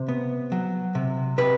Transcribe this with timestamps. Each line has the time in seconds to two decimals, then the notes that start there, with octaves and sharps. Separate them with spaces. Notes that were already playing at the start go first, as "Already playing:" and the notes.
Already playing: C3 C5
0.08 B3
0.52 F#3
0.95 C3
1.38 C3 B4